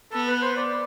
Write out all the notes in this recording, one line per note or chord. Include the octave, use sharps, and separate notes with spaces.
B3 A4
B4
C5
D5